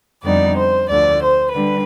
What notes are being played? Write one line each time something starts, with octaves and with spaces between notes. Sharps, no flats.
F2 D3 G3 B3 D#4 D5
C5
D2 D3 F3 D5
C5
D3 G3 B4